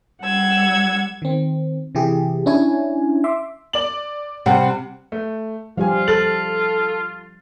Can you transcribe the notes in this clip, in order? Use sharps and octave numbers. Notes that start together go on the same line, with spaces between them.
G3 F#5 E6 G#6
D#3 C4
C3 E3 E4 G4 G#4
C#4 D4 E4 C#5 G#5
E5 C6 D6
D5 F#7
C3 G3 F#5
A3
F3 G3 F4 G4 F5 G#5
A4 F6 A6 F#7